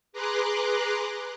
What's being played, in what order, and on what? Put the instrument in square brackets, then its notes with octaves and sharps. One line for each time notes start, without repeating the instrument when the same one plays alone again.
[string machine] G#4 B4 A#5 C6 D6 F#6